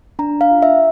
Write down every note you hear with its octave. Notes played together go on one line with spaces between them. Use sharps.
D4 A#5
F5
F4
E5